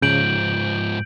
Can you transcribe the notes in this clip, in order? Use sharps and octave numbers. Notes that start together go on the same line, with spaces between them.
G#2 C#3 F3 G6 D7 F#7